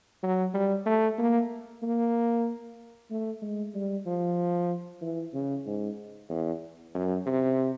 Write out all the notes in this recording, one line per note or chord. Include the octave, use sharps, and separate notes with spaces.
F#3
G3
A3
A#3
A#3
A3
G#3
G3
F3
E3
C#3
G#2
E2
F#2
C3